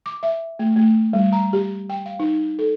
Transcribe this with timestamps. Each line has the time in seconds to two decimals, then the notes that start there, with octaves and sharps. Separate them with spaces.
0.06 D6
0.23 E5
0.59 A3
0.76 A3
1.13 G3
1.33 A#5
1.53 G4
1.90 G5
2.06 F5
2.19 D#4
2.59 A4